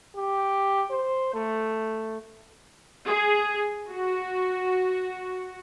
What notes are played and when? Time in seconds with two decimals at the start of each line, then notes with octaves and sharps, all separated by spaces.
0.16 G4
0.90 C5
1.34 A3
3.07 G#4
3.89 F#4